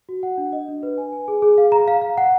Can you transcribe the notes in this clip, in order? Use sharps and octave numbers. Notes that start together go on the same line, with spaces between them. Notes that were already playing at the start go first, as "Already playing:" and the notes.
F#4
F#5
D4
D#5
D4
B4
G#5
G#5
G#4
G#4
F5
A#5
F5
F5
F#5